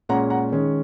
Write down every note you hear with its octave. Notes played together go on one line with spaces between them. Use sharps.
A#2 G#3 C#4 F#5 A#5
F#5 A#5
D#3 G#3 C#4